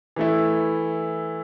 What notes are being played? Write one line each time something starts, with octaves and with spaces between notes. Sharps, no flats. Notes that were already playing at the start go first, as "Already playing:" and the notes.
E3 A3 E4